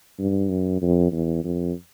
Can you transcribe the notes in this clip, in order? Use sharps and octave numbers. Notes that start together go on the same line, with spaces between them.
G2
F#2
F2
E2
F2